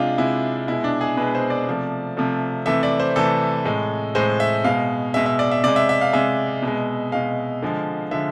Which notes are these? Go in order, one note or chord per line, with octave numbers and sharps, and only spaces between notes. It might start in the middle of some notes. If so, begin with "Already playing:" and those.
Already playing: C3 G#3 D4 F4
C3 G#3 E4
B2 G#3 E4
D4
G#4
B2 G#3 B4
C5
D5
C3 F3 A3
C3 F3 A3
C3 E3 A3 E5
D5
C5
C3 E3 A3 A4
A2 G#3
A2 G#3 C5
E5
B2 G#3 F5
B2 G#3 E5
E5
D5
E5
C3 G#3 D5
E5
E5
F5
C3 G#3 E5
B2
G#3
B2 G#3 F5
D3 F3 G#3
D3 F3 G#3 E5